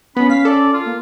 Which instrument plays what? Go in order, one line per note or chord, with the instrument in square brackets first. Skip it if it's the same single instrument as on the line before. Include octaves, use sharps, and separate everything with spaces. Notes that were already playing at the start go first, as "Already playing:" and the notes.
[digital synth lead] B3 [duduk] C#4 [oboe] B5
[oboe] F5 [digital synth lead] B6
[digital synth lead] A4 [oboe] D5
[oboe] F4
[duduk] A#3